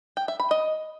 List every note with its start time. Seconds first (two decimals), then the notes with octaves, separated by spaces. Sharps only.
0.17 G5
0.28 E5
0.40 B5
0.51 D#5